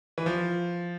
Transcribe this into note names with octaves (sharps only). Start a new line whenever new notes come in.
E3
F3